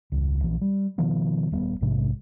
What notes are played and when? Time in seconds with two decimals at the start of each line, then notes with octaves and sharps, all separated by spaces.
0.12 E1 C#2
0.40 A#1 E3
0.61 G3
0.98 B2 D#3 F3 B3
1.52 D#1 G3 B3
1.81 A#1 G#2 C3 G#3